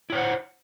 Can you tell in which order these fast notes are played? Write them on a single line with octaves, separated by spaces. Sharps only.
E4 C#5 C5 F#5